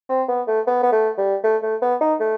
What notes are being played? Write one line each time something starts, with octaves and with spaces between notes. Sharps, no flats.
C4
B3
A3
B3
B3
A3
G3
A3
A3
B3
D#4
A3